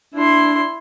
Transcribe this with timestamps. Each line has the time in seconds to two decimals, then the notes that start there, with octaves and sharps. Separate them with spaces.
0.14 D4 E4 C6